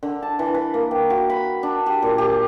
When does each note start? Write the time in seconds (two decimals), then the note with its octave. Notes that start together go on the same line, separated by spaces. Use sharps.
0.03 D3
0.22 A5
0.39 E3
0.54 B4
0.74 A#3
0.91 G5
1.10 F#4
1.30 B5
1.63 D4
1.86 G4
2.02 A#2
2.18 G4